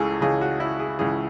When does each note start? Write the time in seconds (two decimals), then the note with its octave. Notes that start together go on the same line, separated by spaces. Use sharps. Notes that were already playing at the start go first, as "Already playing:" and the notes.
Already playing: C#2 C#3 E3 G#4 A4
0.21 C#2 C#3 E3 G#4
0.41 F#4
0.60 E4
0.80 G#4
0.99 C#2 C#3 E3 G#4